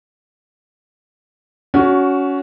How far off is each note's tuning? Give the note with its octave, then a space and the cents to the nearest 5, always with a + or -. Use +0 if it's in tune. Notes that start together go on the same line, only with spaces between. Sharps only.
C#4 +20 F#4 +0